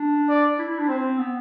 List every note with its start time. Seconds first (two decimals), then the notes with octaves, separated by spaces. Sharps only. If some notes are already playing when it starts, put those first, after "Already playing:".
Already playing: D4
0.29 D5
0.59 E4
0.69 E4
0.79 D4
0.88 C4 C5
1.19 B3